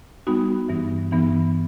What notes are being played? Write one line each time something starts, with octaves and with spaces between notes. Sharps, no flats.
G3 B3 D#4 F#4
G2 E3 B3 D#4
G2 E3 B3 D#4